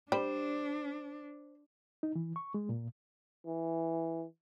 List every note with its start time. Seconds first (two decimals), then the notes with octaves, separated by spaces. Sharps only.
0.12 G3 D4 C5
2.03 D#4
2.15 E3
2.36 C#6
2.54 G#3
2.69 A#2
3.46 E3